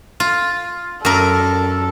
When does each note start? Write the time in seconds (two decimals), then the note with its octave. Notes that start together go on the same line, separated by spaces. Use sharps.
0.20 F4
1.05 F#2 A4 A#4